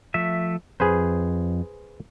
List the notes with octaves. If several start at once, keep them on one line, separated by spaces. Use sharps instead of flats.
F3 A3 E5
F2 G#4 B4 C5